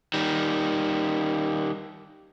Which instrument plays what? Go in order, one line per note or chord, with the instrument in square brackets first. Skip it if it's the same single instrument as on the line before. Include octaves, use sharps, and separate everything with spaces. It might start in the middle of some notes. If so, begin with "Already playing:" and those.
[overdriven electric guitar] D#3 G3